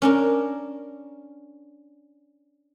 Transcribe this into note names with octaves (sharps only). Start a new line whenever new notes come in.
C#4 D4 A#4